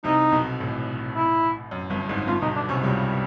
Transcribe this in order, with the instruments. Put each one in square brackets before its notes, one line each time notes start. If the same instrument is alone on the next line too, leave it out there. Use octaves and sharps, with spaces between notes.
[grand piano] C2 C3 [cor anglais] D#4
[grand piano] B1 B2
A1 A2
[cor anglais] E4
[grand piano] F#2
G1 G2
G#1 G#2
[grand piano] G1 G2 [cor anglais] F4
[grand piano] B1 B2 [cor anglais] D#4
[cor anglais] D4
[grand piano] C2 C3 [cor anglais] C#4
[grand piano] C#2 C#3 [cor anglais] G3